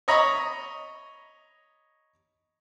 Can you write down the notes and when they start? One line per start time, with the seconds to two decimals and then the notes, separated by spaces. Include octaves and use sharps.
0.08 C#5 D#5 A#5 B5 D#6